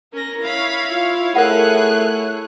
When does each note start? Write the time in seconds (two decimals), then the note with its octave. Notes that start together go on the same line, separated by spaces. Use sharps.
0.14 C#4 A#4 A#6
0.43 E4 C#5 F5 B5
0.92 F4 F5
1.35 A3 G#4 A#4 E5 F#5 F#6